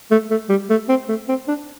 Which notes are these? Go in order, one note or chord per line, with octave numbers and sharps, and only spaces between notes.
A3
A3
G3
A3
C4
A3
C4
D4